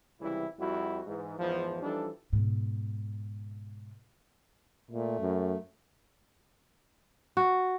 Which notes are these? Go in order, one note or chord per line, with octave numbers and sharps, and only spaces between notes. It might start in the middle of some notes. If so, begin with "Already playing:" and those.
C#2 C3 E3 G3 E4
F2 G3 E4 F#4
G#2 E3
E2 G#2 E3 F3
E3 F3 G3 D4 D#4 A4
G#2 B2
A#2 A3
F#2
F#4